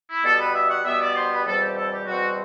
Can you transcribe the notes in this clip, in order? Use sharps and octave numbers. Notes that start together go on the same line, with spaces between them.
E4
B2 G3 B3 A4
B4
E5
F#5
B2 G3 B3 E5
D5
C5
B4
E2 B2 G3 C4 A4
G4
A4
G4
E2 B2 G3 C4 F#4